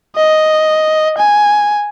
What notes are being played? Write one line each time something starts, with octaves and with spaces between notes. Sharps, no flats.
D#5
G#5